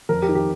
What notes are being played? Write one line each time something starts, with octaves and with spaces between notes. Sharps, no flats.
F2 A#4
G4
D#3
G4